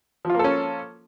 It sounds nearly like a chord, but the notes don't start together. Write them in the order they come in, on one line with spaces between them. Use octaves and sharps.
F3 F4 A#3 A4 C#4